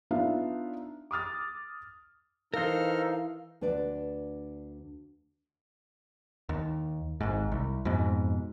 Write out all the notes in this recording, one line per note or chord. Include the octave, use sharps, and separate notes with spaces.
B3 D4 D#4 F4 E5 F5
D6 D#6 F6 A6
E3 D#4 A4 A#4 C5 F5 F6
D2 D4 B4 D5
D#2
G#1 G#2
C2
F2 G#2 B2